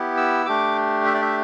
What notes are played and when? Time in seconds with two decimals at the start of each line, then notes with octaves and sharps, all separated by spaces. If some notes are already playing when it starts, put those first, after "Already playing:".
Already playing: B3 E4 G4
0.17 E6
0.46 A3 D4 G4 D6
1.06 E5
1.14 D5
1.22 E5